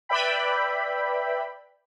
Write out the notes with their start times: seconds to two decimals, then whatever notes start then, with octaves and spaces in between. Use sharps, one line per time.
0.09 B4 D5 E5 G5 B5